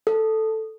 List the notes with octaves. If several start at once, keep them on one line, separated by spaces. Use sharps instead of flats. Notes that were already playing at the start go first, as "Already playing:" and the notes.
A4